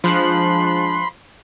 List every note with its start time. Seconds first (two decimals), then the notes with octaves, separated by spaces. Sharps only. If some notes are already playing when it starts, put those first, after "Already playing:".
0.04 F3 G#3 D4 B5 C6 F#6